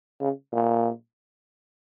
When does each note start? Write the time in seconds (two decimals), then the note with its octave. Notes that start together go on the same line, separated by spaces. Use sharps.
0.20 C#3
0.52 A#2